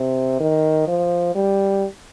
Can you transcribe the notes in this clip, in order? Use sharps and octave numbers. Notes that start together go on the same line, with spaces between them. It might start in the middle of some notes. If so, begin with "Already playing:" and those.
Already playing: C3
D#3
F3
G3